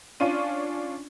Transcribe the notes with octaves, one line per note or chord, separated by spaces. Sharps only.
C#4 D4 F4 D#7